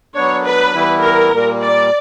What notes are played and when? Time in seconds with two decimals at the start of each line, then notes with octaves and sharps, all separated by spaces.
0.15 F#3 B3 D4 C#5
0.45 B4
0.73 E3 G3 B3 E4
1.03 A#4
1.32 A#2 G3 A#3
1.61 D5